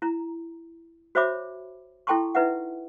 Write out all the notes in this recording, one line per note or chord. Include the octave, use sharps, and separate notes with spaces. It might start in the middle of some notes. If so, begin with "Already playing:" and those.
E4 A#5
F#4 C5 C#5 E5 B5 D6
E4 A4 G5 A5 C6 C#6
D#4 E4 B4 E5 F#5